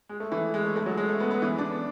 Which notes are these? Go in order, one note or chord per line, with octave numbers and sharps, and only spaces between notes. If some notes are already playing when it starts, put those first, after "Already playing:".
G#3
A3
E3
G#3
A3
A3
F#3
G#3
A3
B3
B3
E3
D4